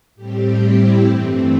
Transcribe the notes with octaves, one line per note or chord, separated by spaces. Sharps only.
A2 G3 C4 G4
E4
G2 E3 A3 C4